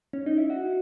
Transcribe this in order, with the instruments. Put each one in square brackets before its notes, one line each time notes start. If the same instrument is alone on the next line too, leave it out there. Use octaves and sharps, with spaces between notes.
[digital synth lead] C#4
D#4
E4
F#4